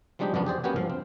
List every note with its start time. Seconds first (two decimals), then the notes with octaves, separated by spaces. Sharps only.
0.19 F3 G3 G#3 D4 D#4 G4
0.34 F#2 D3 F3 B3 D4
0.46 G4 G#4 C5 D5
0.64 A#3 B3 C#4 F#4 G4 G#5
0.76 G2 F3 F5
0.90 C4